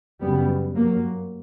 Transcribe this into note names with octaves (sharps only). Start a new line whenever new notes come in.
F#2 C#3 G3 B3
G2 F#3 A#3